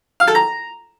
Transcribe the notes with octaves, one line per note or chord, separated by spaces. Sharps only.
F5
A4
A#5